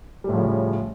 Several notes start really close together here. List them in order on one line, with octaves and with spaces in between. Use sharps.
G3 A2 F3 C#3